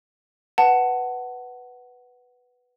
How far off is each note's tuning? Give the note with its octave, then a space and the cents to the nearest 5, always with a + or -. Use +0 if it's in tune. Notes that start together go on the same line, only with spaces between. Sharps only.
B4 +0 F#5 +10 A5 +10